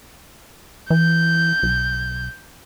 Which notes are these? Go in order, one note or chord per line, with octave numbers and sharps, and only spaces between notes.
E3 G6
B1